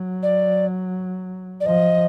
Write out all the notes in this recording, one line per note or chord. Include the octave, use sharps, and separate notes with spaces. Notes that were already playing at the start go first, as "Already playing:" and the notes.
Already playing: F#3
D5
D5
F3 D#5